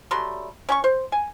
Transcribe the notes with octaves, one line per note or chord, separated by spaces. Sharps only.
F#3 G3 A3 C6
C#4 G5 C#6
C5
G#5